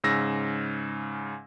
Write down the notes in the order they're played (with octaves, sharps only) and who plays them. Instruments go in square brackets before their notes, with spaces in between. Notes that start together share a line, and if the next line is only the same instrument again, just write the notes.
[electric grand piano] G#2 C#3 E6 A#6